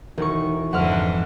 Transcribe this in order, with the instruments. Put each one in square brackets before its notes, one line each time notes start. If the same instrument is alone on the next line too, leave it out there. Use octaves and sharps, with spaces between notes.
[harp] E1 C#6 [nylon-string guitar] D#3
[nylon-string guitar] F2 [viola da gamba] G#2 D3 E3 [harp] F#5 C6 F6